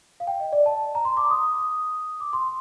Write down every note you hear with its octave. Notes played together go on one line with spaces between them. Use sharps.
F5
G5
D#5
D5
A5
A#5
C6
D6
D#6
D#6
D6
C6